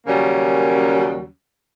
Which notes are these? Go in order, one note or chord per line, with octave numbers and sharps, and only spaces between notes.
D#2 C#3 F#3 G3 A#3 C#4